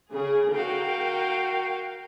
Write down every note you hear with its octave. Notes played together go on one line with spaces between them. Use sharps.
C#3 G#4
F#4 A#4 F5 G5